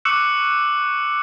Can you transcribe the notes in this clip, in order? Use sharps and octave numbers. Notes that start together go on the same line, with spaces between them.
C#6 D6 E6 F#6 C#7 E7